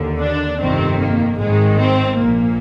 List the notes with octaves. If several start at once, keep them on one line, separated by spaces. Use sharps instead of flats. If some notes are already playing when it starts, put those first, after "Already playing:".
Already playing: D#2 D3
D4
G1 F2 C3 D#3 C4
A#3
G#1 G#2 D#3 G#3
C4
A#1 A#2 A#3